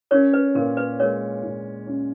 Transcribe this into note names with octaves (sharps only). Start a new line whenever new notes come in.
C#4 A#4 C#5
B4
A#2 A#4
B4
G#3 A#4 C#5
A#2
C#4